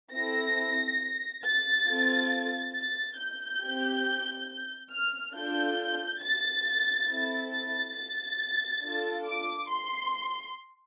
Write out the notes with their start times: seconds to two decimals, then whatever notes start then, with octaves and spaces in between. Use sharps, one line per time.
0.13 C4 E4 A4 A#6
1.43 A6
1.87 C4 F4 A4
2.74 A6
3.18 G6
3.61 C4 G4
4.92 F6
5.35 D4 F4 A4 G6
6.22 A6
7.09 C4 E4 A4
7.52 A6
7.95 A6
8.83 D4 F4 A4
9.26 D6
9.70 C6